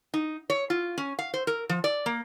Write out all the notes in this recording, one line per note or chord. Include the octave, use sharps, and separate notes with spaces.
D#4
C#5
F4
C#4
F5
C5
A#4
F3
D5
A#3